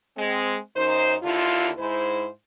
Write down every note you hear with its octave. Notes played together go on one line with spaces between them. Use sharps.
G#3 C4
F#2 D#4 C5
D#2 D3 E4 F4
G#2 E4 C5